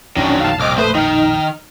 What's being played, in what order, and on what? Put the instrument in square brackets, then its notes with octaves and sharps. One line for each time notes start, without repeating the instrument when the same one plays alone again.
[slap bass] A#1 F2 B2 [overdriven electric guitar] D#3 F#3 [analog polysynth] C#4 D4
[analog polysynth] F5 A5
[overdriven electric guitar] C2 [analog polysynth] D#5 D6 F6
[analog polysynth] A3 B4 D#6 [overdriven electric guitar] C5
[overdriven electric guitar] D#3 [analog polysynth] D#4 F6